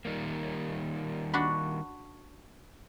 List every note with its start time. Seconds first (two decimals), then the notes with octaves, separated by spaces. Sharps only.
0.05 D#3 G3 A#3
1.34 D4 F#4 B5